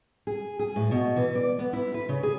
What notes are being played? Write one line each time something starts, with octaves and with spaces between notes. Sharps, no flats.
G#4
G#4
A2
B2
E3
D5
B3
E4
B4
C#3
G#4